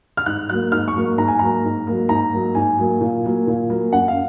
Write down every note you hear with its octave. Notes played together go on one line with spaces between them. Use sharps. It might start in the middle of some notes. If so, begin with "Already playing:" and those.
F6
G#2 F#6
F#3 A#3 F#6
G#2 F6
C#6
F#3 A#3
G#2 A#5
G#5
F#3 A#3 A#5
G#2
F#3 A#3
G#2 A#5
F#3 A#3
G#2 G#5
F#3 A#3
A#2
F#3 A#3
A#2
F#3 A#3
F#2 F#5
F5